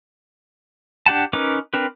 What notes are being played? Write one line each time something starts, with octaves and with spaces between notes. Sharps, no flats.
D4 G4 F#5 A5
C#4 D#4 A#4 B4 D6
C4 D4 A#4 B4